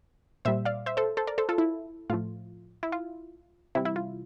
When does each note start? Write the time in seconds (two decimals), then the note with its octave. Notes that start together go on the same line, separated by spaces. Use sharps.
0.45 A#2 G3 C5 E5
0.65 D5 F5
0.86 C5 E5
0.97 A4 C5
1.17 A4 C5
1.27 A#4 D5
1.38 A4 C5
1.49 F4 A4
1.58 E4
2.10 A2 F3 A3 F4
2.83 E4
2.92 F4
3.75 C3 E3 G3 E4
3.85 E4
3.96 F4